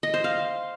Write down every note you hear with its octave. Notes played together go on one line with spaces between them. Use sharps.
D#5
C5
F5